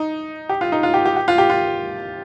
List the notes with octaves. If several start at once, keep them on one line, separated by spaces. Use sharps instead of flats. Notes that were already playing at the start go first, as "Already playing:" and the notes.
Already playing: D#4
G4
F4
D#4
F4
G4
G4
G4
F4
G4
F4